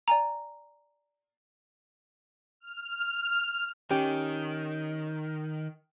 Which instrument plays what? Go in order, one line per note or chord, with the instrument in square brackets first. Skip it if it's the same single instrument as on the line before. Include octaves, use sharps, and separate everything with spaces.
[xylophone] D5 G#5 A#5
[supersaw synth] F6
[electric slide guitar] D#3 [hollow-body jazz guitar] C#4 G4